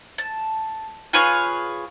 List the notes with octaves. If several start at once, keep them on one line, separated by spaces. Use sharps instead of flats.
A5
F4 G#4 B4 C#5